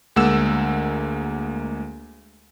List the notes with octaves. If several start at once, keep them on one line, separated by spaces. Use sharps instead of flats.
D2 G#3 A#3 F#5 E6 E7